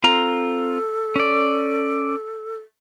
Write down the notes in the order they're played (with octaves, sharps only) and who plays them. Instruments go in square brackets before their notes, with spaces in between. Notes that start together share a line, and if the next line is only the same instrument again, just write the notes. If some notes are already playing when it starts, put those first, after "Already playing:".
[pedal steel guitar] C4 F4 A#5 [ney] A4
[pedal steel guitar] C#4 D5